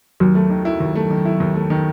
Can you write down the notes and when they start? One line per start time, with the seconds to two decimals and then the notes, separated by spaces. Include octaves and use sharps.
0.20 D#2 F#3
0.35 A3
0.50 D#3
0.65 E4
0.80 D#2
0.95 A3
1.10 D#3
1.25 E4
1.40 D#2
1.55 A3
1.70 D#3